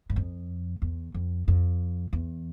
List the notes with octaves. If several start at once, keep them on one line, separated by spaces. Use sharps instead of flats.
G2
F2
E2
F2
F2
E2